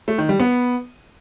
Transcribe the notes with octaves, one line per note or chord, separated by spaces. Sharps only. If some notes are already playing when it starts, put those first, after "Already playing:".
A3
D#3
G3
B3